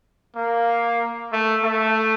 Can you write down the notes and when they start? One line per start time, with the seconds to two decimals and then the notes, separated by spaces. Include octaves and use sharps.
0.36 A#3
1.32 A3
1.64 A3